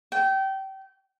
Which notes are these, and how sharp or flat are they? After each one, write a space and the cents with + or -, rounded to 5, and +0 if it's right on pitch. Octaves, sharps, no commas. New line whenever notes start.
G5 -25